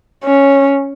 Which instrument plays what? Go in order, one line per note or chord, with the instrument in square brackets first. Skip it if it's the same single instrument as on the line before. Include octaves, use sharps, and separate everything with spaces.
[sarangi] C#4